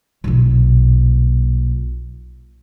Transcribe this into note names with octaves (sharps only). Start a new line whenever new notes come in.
B1 A#2